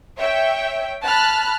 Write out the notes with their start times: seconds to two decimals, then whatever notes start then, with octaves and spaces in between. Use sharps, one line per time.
0.16 C#5 E5 G5
1.02 A5 B5 F6 F#6